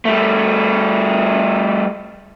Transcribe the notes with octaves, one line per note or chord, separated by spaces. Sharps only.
G3 A3